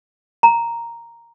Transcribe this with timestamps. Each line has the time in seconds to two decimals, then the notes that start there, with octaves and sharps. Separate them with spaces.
0.43 A#5